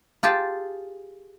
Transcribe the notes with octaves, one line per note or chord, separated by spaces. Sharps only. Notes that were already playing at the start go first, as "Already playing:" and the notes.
F4 G4 G#4 A5